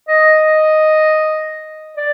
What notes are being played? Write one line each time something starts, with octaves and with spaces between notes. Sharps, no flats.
D#5
D5